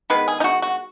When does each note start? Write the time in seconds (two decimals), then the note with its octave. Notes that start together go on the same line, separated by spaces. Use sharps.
0.10 D#3 G#3 B3 B4
0.28 G#4
0.40 D#4
0.44 F#4
0.62 F#4